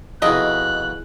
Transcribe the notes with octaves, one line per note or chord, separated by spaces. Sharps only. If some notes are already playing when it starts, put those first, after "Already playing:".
F2 B2 E4 G#4 A#4 D#5 F#6